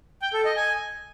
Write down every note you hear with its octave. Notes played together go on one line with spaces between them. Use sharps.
G5
A4
D#5
G#5